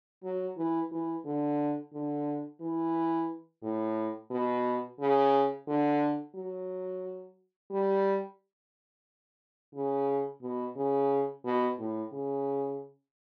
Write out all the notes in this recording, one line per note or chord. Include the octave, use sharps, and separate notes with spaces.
F#3
E3
E3
D3
D3
E3
A2
B2
C#3
D3
F#3
G3
C#3
B2
C#3
B2
A2
C#3